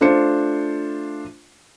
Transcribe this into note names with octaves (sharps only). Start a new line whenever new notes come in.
A3 D4 F4 C5 C#7